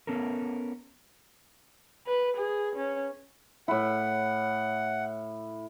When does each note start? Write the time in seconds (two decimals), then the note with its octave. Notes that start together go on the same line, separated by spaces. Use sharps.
0.07 B3 C#4 A4 A#4
2.06 B4
2.37 G#4
2.76 C#4
3.68 A2 E4 F#5